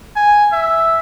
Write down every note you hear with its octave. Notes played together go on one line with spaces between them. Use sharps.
G#5
E5